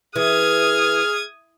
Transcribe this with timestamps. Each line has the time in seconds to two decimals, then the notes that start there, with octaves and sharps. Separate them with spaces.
0.16 E3 G#4 D#6 F6 G#6